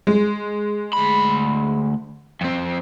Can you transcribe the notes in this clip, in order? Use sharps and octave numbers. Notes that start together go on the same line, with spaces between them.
G#3
D2 B5
F2 C4